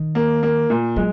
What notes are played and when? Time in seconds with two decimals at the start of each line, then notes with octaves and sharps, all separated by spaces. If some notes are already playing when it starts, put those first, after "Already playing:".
Already playing: D#3
0.15 A#3
0.43 A#3
0.70 A#2
0.96 F#3 G#3